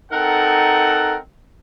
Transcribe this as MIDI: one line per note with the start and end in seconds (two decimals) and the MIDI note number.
0.12 1.17 60
0.12 1.17 63
0.12 1.17 69
0.12 1.17 70
0.12 1.17 78